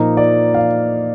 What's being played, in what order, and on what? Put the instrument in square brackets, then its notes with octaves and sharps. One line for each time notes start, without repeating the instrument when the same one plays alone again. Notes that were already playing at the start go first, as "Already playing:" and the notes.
Already playing: [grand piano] A#2 F3 A#3 D#4 D#5
D5
F5